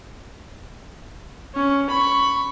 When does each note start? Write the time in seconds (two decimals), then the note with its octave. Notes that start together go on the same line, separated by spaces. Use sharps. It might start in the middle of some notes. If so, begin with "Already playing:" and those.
1.55 C#4
1.90 B5 C#6